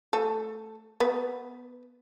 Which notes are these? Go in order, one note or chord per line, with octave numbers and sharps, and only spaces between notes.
A3 A4
B3 B4